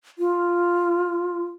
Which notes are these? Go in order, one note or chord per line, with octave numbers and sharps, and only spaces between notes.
F4